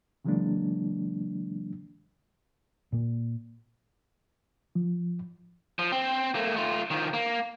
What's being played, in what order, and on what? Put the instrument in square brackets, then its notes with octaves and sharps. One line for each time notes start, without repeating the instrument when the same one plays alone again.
[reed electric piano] C#3 E3 F#3 G#3 A#3 D4
[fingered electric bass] A#2 A#3
[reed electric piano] F3
[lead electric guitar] F3
C4
A3 A#3
A3 F4
D#3 F3
A#3